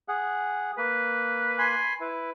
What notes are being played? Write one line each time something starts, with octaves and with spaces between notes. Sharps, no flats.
G#4 F#5
A#3 B4
G#5 B5 C6
E4 B4